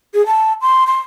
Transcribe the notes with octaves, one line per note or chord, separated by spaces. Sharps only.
G#4
A5
C6
C6